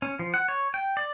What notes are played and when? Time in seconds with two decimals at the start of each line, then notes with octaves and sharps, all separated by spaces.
0.02 C#4
0.19 F3
0.34 F#5
0.48 C#5
0.74 G5
0.97 D5